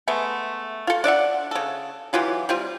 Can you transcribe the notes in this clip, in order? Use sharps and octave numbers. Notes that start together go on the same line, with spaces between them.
G#3 A3 B3
F4 A4
D4 D5 E5 F#5
C#3 A4
E3 F#3 F4 G4
G3 C4 F4